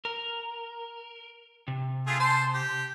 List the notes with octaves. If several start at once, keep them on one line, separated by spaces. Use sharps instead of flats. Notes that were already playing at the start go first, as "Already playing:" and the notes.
A#4
C3
A3 F4 G#4
C5 A5 C6
G4